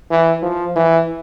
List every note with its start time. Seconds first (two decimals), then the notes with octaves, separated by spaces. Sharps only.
0.10 E3
0.43 F3
0.76 E3